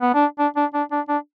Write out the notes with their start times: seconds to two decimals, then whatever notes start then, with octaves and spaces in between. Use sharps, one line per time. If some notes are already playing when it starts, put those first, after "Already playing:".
0.01 B3
0.14 D4
0.39 D4
0.57 D4
0.74 D4
0.92 D4
1.09 D4